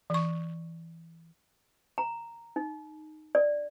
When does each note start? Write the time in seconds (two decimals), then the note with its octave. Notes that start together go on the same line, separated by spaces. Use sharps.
0.10 E3 C#6
1.98 A#5
2.56 D#4
3.35 D5